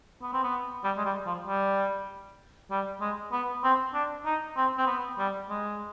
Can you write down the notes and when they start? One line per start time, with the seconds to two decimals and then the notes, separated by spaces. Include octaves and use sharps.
0.22 B3
0.33 C4
0.43 B3
0.84 G3
0.97 G#3
1.05 G3
1.26 F3
1.46 G3
2.71 G3
3.01 G#3
3.32 B3
3.63 C4
3.94 D4
4.25 D#4
4.57 C4
4.78 C4
4.87 B3
5.19 G3
5.49 G#3